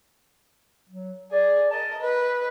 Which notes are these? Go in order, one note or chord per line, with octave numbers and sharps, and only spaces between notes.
F#3
G#4 D5
A#4 D#5 A5
B4 D#5